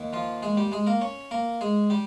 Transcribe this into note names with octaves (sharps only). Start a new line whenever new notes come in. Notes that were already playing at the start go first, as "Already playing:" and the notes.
Already playing: D#2 D#3
F3 F4
G#3 G#4
G3 G4
G#3 G#4
A#3 A#4
C#4 C#5
A#3 A#4
G#3 G#4
G3 G4